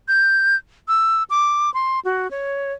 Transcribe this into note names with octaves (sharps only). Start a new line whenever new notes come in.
G6
E6
D6
C6
F#4
C#5